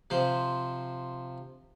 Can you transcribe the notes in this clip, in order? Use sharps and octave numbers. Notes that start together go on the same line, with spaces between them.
C3 F3 C5